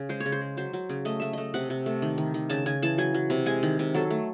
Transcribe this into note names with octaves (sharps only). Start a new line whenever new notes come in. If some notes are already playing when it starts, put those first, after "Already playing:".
Already playing: C#3
G#3 C5
C#5
C#3
C5
G#3
F#3 C5
F#3
C#3
A3 D#5
A3 E5
A3 D#5
C3 F#5
C3
A3
D#3
D#3
D#3
C#3 A5
C#3 G#5
E3 A5
F#3 G#5
F#3
C3
G#3 G#5
D#3
C3
F#3 A4
A3